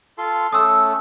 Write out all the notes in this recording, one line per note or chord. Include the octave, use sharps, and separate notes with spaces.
F4 A4 C6
A3 C#4 A4 D#6 E6